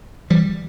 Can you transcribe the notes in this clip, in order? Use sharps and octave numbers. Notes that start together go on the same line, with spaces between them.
E3 G3